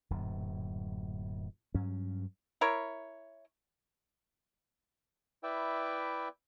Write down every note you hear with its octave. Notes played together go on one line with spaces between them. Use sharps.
D1 F#2 A#2
G2 F#3 C#4
E4 A#4 C#5
E4 B4 D5 E5 G5